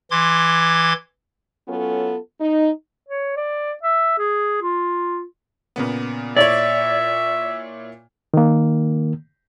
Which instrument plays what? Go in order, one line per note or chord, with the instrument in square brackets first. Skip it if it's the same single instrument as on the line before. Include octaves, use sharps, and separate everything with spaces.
[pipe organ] E3 C6 D6 G#6
[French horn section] F#3 B3 C#4 F4 A4
D#4
[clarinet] C#5
D5
E5
G#4
F4
[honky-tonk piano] A#2 C#3 B3
[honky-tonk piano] A#2 E4 C#5 [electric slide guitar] D5 [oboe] E5
[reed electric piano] D#3 A#3